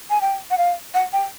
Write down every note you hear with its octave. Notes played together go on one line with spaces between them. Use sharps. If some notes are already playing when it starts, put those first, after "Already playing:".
G#5
G5
F#5
F5
F#5
G5